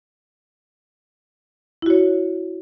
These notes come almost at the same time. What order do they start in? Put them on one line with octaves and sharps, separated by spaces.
E4 F#4 C#5